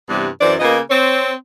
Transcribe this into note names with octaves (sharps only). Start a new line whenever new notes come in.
G2 C3 E3 G3 B3
F#2 E3 C5 D5
C#3 A#3 B3 F4 D#5
C4 C#5